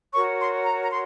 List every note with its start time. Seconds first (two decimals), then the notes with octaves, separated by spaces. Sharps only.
0.13 F#4 A#4 C#5 C#6
0.40 C6
0.65 A#5
0.84 A#5
0.90 C6